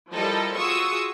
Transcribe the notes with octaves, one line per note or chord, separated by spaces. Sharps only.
F3 G3 E4 A4 A#4 D#5
F4 F#4 G#4 C#6 D#6 E6